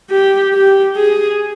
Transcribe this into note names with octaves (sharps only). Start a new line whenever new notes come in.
G4
G4
G#4